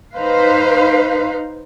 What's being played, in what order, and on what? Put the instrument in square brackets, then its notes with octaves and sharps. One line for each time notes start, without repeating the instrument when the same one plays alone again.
[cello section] D#4 B4 C5 F5